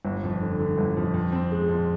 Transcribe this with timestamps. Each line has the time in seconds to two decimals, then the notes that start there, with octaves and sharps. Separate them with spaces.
0.05 G1
0.24 F2
0.41 D3
0.59 D3
0.78 G1
0.97 F2
1.14 F2
1.32 C4
1.51 G#3
1.69 F2